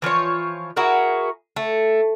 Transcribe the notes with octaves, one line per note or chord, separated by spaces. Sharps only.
E3 F3 F4 C#5
E4 F#4 G#4 A#4
A3